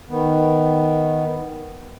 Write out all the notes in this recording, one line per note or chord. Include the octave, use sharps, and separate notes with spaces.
D#3 B3